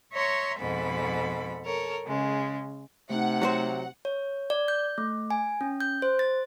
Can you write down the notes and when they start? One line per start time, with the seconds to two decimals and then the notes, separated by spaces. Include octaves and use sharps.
0.12 C#5 E5 A#5 C6 C#6
0.58 F2 G#2 B2 A4 B5
1.64 A4 A#4 C#5
2.06 C#3 G#3
3.10 C3 A3 D#4 F#5
3.42 F#3 F#4 C5
4.05 C#5
4.50 D5
4.68 G6
4.98 A3
5.30 G#5
5.61 C#4
5.80 G6
6.02 C5
6.19 A6